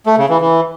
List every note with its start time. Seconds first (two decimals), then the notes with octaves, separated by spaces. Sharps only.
0.06 A3
0.18 C#3
0.29 E3
0.41 E3